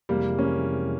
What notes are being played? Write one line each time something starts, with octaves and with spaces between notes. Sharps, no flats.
F2 C3 E3 G3 G#3 A#3
A#3 C#4